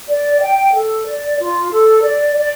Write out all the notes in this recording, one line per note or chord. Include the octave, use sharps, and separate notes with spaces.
D5
G5
A4
D5
F4
A4
D5
D5